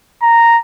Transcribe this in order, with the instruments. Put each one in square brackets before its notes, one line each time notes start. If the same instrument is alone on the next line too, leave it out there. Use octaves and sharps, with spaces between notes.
[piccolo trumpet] A#5